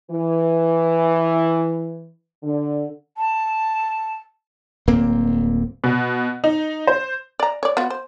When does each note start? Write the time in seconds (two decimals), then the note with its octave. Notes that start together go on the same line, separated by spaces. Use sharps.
0.11 E3
2.43 D3
3.18 A5
4.87 D1 A#3 C4
5.84 B2
6.44 D#4
6.87 C5
7.40 D5 A#5
7.63 C#5 D5
7.77 B3 F4 F#4
7.90 C5